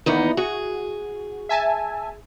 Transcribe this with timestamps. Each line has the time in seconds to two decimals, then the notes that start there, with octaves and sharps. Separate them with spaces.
0.06 E2 D#3 A#3 B3 D#4
0.37 F#4 G#4
1.49 E5 G#5 A5